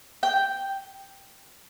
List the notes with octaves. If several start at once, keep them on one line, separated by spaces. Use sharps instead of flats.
G5